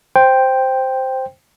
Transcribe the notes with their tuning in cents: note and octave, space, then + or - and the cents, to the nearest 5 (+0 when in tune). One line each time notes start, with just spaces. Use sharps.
C5 +0 G5 +0